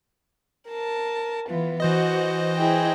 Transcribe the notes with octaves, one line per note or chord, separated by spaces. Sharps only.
A#4 A5
E3 B3 F4
E3 F#4 C5 D#5
E4 G#4 G5